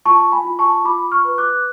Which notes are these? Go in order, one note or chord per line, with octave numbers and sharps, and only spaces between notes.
F4 A5 C#6
G#5 B5
F4
A5 C#6
F4 B5 D6
C#6 F6
B4
D6 F#6